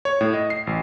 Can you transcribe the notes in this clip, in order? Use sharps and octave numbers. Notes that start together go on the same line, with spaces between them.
C#5
A2
D#5
C7
A1